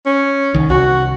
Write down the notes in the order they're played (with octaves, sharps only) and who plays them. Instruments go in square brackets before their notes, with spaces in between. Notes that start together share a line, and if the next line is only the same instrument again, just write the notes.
[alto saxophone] C#4
[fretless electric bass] C2 D#3
[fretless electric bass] C2 [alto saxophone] F#4